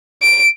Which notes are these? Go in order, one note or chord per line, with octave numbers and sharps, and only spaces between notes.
D7